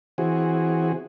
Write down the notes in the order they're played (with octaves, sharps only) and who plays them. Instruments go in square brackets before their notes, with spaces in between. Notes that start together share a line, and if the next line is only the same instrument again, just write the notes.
[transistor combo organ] E3 C4 F#4 G#4